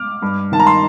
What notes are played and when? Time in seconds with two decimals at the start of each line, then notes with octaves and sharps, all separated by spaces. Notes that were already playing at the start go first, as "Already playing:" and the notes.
Already playing: D6 F6
0.22 G2
0.52 D#3 A5
0.60 A#5
0.67 C6